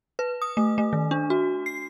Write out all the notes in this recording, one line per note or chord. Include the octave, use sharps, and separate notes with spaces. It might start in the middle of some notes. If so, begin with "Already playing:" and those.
B4
D#6
A3
A3
D#3
D4
F#4
C7